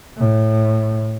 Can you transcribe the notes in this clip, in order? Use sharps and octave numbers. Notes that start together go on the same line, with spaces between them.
A2